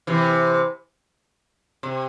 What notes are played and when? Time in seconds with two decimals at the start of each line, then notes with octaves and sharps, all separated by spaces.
0.07 C3 E3
1.83 C3